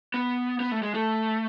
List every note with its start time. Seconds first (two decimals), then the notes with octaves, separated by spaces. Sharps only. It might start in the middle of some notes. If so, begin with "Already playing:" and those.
0.14 B3
0.60 B3
0.72 A3
0.83 G#3
0.94 A3